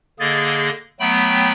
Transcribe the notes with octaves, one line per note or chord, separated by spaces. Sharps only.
D3 A#3 G#4 D#5 G#6 A6
F#3 A3 B3 G5 B5